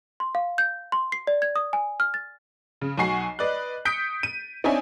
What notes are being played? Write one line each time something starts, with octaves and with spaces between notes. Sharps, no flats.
C6
F5
G6
C6
C7
D5
G#6
D#6
G#5
F6
A6
C#3
B1 F#4 F#5 G#5 C#6 C7
B4 D5 D#5 F#6
D#6 G6 B6 C#7 D7
D#7
C4 D4 D#4 C#5 E5 G#5